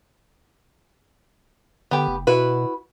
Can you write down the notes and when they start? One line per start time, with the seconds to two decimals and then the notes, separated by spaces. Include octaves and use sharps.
1.91 D3 B3 G4
2.08 F1
2.27 B2 E4 F#4 B4